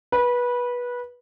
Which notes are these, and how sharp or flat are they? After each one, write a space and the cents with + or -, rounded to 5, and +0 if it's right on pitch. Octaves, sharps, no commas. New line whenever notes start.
B4 -20